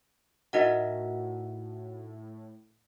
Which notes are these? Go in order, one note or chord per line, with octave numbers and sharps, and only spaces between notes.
A2 D#4 F#4 A#4 D#5 E5 F#5